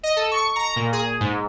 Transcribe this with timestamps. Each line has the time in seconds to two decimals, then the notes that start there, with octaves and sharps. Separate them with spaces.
0.03 D#5
0.16 A4
0.31 C#6
0.56 A#5
0.76 A#2
0.93 G#4
1.20 G#2